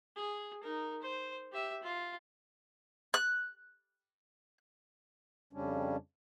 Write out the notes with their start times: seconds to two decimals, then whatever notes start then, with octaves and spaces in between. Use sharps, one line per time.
0.16 G#4
0.63 D#4 A#4
1.02 C5
1.52 G4 E5
1.82 F4
3.14 F#6
5.53 F2 C#3 G3 C#4 D4